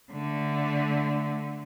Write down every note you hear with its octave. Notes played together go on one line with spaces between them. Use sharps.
D3 A3